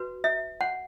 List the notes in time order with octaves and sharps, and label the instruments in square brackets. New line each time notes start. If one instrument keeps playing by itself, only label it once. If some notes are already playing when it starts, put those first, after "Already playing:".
Already playing: [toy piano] F#4 B4
E5
F#5